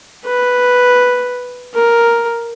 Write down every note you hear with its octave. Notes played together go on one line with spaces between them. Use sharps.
B4
A#4